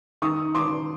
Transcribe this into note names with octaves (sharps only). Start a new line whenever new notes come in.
D#3 C#6 D#6
D#3 C6 D6